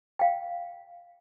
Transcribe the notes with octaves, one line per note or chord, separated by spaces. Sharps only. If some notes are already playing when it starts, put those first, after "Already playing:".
F5 G5